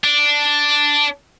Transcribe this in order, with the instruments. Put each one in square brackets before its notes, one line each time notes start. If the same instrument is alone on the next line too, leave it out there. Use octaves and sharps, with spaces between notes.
[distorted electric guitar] D4